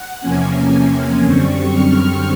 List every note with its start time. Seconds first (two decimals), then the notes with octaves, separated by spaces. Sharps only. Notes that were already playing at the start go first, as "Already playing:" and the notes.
Already playing: F#5
0.21 E2 C3 F3 A#3 C#4 G#5
1.23 F#2 D3 G3 C4 C#6
1.73 F6